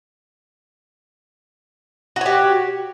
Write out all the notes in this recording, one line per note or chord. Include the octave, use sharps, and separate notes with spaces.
F#4 G4 C#5